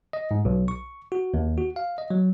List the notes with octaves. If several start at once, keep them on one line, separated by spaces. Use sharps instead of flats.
D#5
G#2
B1
C#6
F#4
D#2
F#4
F5
D#5
F#3